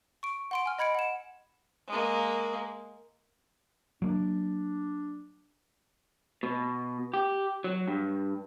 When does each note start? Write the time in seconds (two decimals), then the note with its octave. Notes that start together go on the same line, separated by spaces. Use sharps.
0.23 C#6 D7
0.51 F#5 C6 D7
0.66 G#5 F6
0.79 D#5 B5 G#6 C#7 D7
0.95 F#5 E7
1.88 G#3 A#3
4.02 F#3 A#3 D4
6.43 B2
7.14 G4
7.64 F#3
7.88 G2